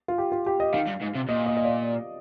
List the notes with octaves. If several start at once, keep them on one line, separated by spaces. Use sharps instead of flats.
F4
G4
F4
G4
D#5
D#3 F5
G2
G#2
C3
A#2 D#5
D#5
D#5
D5